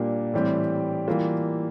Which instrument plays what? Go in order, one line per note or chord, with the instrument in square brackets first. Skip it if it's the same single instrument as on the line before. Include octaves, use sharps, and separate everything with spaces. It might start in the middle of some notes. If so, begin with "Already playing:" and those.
Already playing: [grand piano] A#2 G3 A#3 D4 G4
A2 E3 G3 C4 G4
E3 G3 A#3 F4